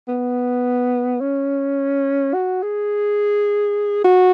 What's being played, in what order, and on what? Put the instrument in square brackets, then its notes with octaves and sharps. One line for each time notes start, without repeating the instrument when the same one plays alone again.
[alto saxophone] B3
C#4
F#4
G#4
F#4